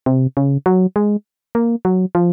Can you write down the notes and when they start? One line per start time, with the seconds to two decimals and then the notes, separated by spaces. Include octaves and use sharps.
0.06 C3
0.37 C#3
0.66 F#3
0.96 G#3
1.55 A#3
1.85 F#3
2.15 F3